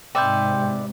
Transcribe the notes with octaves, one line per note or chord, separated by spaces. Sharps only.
G#2 C3 B4 D5 E5 G5 C6 G6